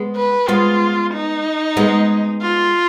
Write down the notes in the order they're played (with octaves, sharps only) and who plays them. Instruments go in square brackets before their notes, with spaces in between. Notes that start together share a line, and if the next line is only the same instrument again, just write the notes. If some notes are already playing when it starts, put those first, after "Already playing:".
Already playing: [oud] G#3 B3
[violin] B4
[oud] G#3 B3 [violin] F4
[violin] D#4
[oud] G#3 B3
[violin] F4